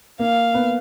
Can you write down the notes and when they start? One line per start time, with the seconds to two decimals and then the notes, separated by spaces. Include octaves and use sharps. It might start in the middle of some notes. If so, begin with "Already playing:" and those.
0.19 A#3 F5
0.54 B3